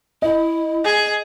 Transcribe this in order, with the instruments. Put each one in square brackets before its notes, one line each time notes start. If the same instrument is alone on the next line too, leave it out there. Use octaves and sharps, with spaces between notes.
[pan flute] E4 [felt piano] D#5
[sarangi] G#4